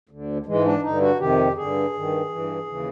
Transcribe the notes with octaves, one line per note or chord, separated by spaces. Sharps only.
D2 D3
G#2 E3 G#3
D4
G2 D3 D#4
F#4
F2 C3 D#3 G4
G2 D3 G#4
G2 D#3
G2 E3
D#2 C#3 E3